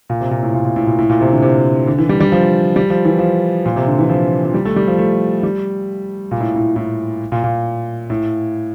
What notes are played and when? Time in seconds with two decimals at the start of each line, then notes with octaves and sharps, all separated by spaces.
0.10 A#2
0.21 C3
0.31 A#2
0.43 A2
0.54 A#2
0.65 A#2
0.76 A2
0.87 A#2
0.99 A2
1.10 A#2
1.21 C3
1.32 D3
1.42 C3
1.87 D3
1.98 E3
2.09 G3
2.21 G3
2.32 F3
2.76 G3
2.90 F3
3.05 E3
3.19 F3
3.66 A#2
3.76 C3
3.87 D3
3.99 E3
4.09 F3
4.45 F3
4.54 G3
4.65 A3
4.76 G3
4.87 F3
4.99 A3
5.43 G3
6.31 A#2
6.41 A2
6.56 A2
6.76 A2
7.32 A#2
7.44 A#2
8.10 A2